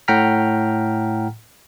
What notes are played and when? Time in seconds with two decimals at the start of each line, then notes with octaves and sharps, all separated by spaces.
0.08 A2 F#5 G5 A#5 F6 B6